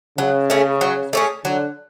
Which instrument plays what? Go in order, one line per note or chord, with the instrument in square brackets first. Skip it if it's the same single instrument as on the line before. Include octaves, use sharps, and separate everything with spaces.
[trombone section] C#3 [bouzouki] F#3
[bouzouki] A3 C#4 G#4
F#3
A3 C#4 G#4
[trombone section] D3 [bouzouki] F#3